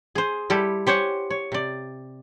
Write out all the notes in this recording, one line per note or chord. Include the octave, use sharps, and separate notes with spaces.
G#4 C5
G3 E4 G4 A4
G4 C5 C#5 F#5 G#5
C#5
C3 D5